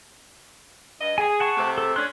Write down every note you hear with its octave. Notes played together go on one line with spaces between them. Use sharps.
G2 D#5
G#4 G#5
F#5 A5 C#6
C3 A3
A4
C#4 D4 C6 F#6